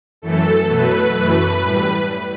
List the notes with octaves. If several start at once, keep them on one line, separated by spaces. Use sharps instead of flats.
F#2 E3 A3 A4
B2 F#3 A3 B4
F#2 E3 A3
A2 G3